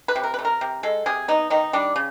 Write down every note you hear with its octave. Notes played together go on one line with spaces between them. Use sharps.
B4
C3
A#4
B4
A3
A#4
C3
G#3 A4
C3 G#4
B3 D#4
D#3 D#4
G3 D4
C#3